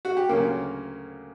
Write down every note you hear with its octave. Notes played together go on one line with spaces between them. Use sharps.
F#4
G4
D2 C#3 F#3 A#3 A#4